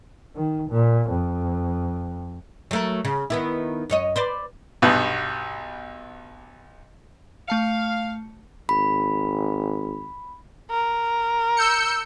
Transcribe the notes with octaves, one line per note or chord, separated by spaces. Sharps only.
D#3
A#2
F2
F#3 A3 A#4
C#3
D#3 B3 E4
F#2 C#5 D#5
B4 C5 D5
B1 G2 B2 B3 F#5
A3 F5 A5 C#7
G#1 B5
A#4
E6 G6 C#7